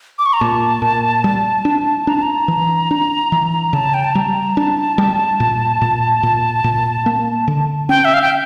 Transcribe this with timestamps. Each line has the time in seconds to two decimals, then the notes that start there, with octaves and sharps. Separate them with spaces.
0.19 D6
0.26 C#6
0.33 A#5
0.40 A#2 A5
0.82 A#2
1.24 G3
1.65 D4
2.07 D4 A#5
2.14 A5
2.22 A#5
2.48 E3
2.91 D4
3.32 E3
3.73 C#3 A5
3.94 G5
4.04 A5
4.15 G3 A#5
4.56 D4 A5
4.98 G3
5.40 A#2
5.82 A#2
6.23 A#2
6.64 A#2
7.06 A#3
7.48 D3
7.89 C#4 G5
8.05 E5
8.14 F5
8.22 G5